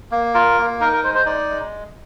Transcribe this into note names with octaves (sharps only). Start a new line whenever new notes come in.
A#3
F4 A#4
A#3
D#4 A#4
A#4
G#3 C5
C5
D#4 D5
G#3